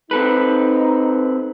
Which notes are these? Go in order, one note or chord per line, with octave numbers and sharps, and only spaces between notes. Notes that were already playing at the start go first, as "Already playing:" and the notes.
C4 D#4 A4 B4